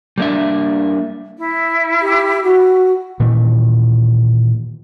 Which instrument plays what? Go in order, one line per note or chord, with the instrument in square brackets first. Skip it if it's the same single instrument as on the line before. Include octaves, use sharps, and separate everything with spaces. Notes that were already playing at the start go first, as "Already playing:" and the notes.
[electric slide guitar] G3 A#3 D4 E5
[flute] E4
[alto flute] G4
F#4
[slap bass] A#2 D#3 E3